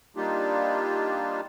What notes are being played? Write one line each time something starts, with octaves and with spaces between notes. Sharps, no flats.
G3 A#3 D4 D#4 F4 G4